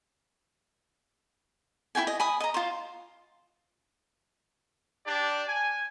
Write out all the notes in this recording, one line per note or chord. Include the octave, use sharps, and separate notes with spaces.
E4 F4 G5 G#5
D#5
G#5 B5 D#6
D#5 A#5
F4 C5
D4 G4 D5
G#5